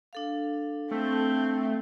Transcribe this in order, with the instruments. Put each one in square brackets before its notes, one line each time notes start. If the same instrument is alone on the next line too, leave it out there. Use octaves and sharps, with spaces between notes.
[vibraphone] D4 A4 F5
[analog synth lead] A3 [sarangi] C4